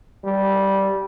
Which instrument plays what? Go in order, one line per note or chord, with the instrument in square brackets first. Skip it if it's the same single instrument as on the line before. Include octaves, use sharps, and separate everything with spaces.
[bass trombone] G3